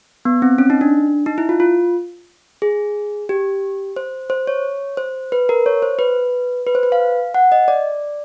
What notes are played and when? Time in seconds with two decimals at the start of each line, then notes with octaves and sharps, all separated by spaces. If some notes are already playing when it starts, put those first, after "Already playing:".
0.25 B3
0.42 C4
0.58 C#4
0.70 D#4
0.81 D4
1.26 D#4
1.38 E4
1.49 F4
1.60 F4
2.62 G#4
3.29 G4
3.96 C5
4.30 C5
4.47 C#5
4.97 C5
5.32 B4
5.49 A#4
5.66 C#5
5.82 C5
5.99 B4
6.67 B4
6.75 C5
6.83 B4
6.92 F5
7.34 F#5
7.52 D#5
7.68 D5